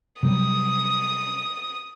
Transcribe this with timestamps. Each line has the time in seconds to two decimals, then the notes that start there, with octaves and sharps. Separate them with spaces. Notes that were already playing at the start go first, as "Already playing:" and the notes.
0.23 C3 F#3 G3 D#6